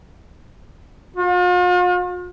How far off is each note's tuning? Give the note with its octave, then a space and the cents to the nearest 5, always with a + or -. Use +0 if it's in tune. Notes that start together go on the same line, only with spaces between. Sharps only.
F4 +45